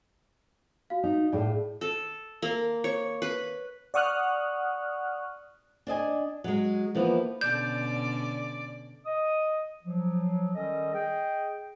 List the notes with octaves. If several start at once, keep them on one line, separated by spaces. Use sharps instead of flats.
F#4 F5
D#4
A2 G#4 D5 G5
A4
A#3
C#5
B4
D5 F#5 C#6 D#6 F6 F#6
D4 D5 D#5 G#5
F#3 G#3
E3 F3 A#3 B3
B2 D3 C#4 D5 G6
D#5 D#6
F3 F#3
D#3 G3 C#4 A4 D#5
G#4 D#5 G5